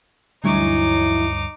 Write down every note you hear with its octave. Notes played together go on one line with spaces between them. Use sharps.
D2 G2 E3 F#3 D#4 C#5 D6